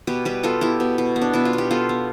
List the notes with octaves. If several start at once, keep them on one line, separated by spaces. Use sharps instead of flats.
B2 G4 B4
G3 G4 B4
B3 F4 A4
B3 E4 G4
B2
B2
B3
D4
B2 E4
F4
B2
G4
B3 F4 A4
B3